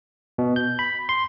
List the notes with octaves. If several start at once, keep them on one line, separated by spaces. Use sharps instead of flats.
B2
G6
B5
C6